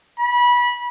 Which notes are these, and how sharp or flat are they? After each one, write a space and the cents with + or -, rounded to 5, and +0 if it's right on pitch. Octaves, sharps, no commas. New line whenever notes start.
B5 -25